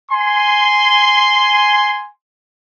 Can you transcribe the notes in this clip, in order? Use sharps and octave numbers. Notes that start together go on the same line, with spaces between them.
G#5 C6